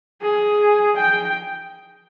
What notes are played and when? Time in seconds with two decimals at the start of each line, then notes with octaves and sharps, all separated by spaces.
0.22 G#4
0.96 G5